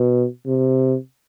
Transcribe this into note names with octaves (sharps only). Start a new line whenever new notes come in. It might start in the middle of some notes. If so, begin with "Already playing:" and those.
Already playing: B2
C3